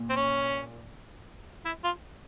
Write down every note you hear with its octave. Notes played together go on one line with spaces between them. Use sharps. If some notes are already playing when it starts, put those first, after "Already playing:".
Already playing: A#2
C4
C#4
E4
F4